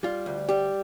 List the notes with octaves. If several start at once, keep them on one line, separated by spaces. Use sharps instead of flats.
G3 F4
D2
G3 G4